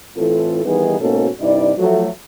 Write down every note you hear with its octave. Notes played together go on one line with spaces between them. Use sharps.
A2 E3 C4 F4 A4
D#3 E3 G3 B3 D#4 G#4
G#2 B2 A#3 C#4 F#4 A4
G2 C3 D#4 E4 D5
F3 F#3 A3